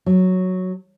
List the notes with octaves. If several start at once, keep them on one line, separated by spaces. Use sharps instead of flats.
F#3